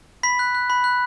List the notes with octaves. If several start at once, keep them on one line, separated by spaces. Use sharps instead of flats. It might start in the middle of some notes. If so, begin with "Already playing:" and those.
B5 B6
F#6
F#6
B5
F#6